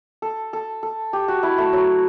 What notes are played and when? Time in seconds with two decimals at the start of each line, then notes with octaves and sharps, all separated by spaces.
0.22 A4
0.53 A4
0.83 A4
1.13 G4
1.28 F#4
1.43 E4
1.58 A3
1.73 F#3